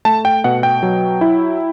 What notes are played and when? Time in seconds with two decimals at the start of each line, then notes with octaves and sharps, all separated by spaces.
0.05 A3 A5
0.25 G5
0.44 B2 F#5
0.63 G5
0.83 F#3
1.21 E4